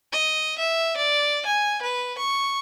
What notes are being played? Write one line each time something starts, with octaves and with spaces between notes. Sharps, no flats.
D#5
E5
D5
G#5
B4
C#6